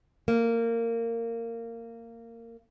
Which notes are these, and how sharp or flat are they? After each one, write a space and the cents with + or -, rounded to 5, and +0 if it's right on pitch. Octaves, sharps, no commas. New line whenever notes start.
A#3 -20